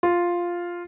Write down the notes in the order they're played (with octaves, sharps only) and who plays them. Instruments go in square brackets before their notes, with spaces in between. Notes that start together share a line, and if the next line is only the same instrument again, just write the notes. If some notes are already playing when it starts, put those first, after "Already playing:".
[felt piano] F4